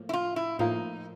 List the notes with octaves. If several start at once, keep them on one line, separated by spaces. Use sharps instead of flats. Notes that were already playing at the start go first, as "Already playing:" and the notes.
Already playing: A2 F3 A#3
E4
F4
E4
A2 F3 A#3 D#4